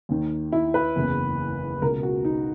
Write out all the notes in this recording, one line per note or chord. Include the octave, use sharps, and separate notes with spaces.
D#2 D#3
E4
B4
F#1 E2 C#3
C#2 B2 A#4
F#4
D#4